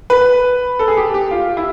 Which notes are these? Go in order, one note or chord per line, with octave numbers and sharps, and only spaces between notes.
B4
A4
G#4
G4
G4
F4
E4